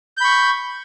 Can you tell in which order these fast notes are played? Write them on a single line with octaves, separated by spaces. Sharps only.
G6 B5 C#6